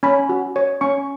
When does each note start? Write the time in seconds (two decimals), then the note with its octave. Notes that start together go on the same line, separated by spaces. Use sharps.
0.03 C#4 B5
0.29 F#4
0.56 C#5
0.81 C#4 C#6